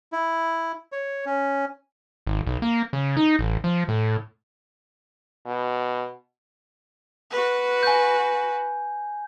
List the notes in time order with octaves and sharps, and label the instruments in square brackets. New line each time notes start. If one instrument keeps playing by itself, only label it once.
[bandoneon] E4
C#5
C#4
[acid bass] G#1
B1
A#3
C#3
D#4
A1
F3
A2
[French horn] B2
[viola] F#4 B4
[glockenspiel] G#5 G6